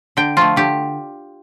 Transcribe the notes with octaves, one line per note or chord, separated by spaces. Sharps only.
D3 G5
F3 A3 F4
D3 G4